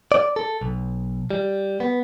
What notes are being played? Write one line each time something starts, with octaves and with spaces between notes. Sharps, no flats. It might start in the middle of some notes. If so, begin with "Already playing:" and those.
D5
A4
B1
G3
B3